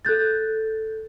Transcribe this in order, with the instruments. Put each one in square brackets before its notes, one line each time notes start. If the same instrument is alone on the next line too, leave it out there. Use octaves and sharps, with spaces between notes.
[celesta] A4 F#6 G6 A6